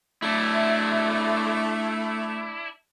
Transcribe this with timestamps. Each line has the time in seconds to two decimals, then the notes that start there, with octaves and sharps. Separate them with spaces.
0.22 A3 D4 E4